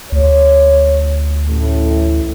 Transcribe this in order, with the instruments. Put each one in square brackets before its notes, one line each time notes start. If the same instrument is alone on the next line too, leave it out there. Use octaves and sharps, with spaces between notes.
[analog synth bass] D2 [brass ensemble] C#5
[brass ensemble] A1 A2